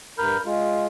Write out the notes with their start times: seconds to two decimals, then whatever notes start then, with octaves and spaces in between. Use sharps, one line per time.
0.18 G2 A#4 B5 F6 G6
0.46 G#3 F4